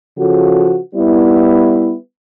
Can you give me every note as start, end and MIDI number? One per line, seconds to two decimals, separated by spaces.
0.18 0.77 49
0.18 0.77 53
0.18 0.77 66
0.18 0.77 69
0.95 1.93 55
0.95 1.93 59
0.95 1.93 64